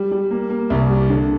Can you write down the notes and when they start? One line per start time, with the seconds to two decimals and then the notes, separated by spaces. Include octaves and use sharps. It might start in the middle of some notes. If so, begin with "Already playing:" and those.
Already playing: G3
0.11 G3
0.31 A#3
0.50 A#3
0.70 C2
0.89 G3
1.09 D3